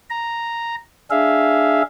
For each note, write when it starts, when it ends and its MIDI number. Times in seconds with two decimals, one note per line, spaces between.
0.10 0.75 82
1.10 1.82 62
1.10 1.82 68
1.10 1.82 76
1.10 1.82 77